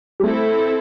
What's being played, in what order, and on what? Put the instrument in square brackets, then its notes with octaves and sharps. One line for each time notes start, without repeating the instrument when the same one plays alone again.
[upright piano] G3
[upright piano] A3 [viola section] C4 E4 A4